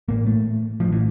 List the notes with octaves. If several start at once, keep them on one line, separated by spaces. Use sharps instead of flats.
A1 A2 A#3
A3
A1 A2 F3
E3